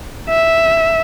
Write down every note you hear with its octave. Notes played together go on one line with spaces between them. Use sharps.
E5